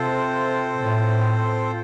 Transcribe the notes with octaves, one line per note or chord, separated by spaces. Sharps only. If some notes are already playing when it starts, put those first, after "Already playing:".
Already playing: C3 C4 F4 A4 C5
A2